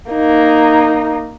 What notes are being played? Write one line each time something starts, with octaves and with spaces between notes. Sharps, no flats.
A#3 D#4